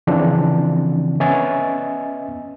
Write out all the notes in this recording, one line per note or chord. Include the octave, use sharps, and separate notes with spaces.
C#3 E3 F3 C4 D4
B3 C#4 D#5 E5 G#5 A6